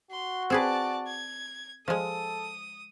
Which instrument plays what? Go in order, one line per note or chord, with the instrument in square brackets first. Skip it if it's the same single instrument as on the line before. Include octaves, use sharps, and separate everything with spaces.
[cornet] F#4 [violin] C6
[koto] C4 G#4 B4 [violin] D5 A5
[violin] G#6
[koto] F3 G#3 [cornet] A4 [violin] D#6